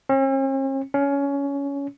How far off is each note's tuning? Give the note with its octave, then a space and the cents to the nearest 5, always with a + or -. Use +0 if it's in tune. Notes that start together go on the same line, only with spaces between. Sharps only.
C#4 -45
C#4 +20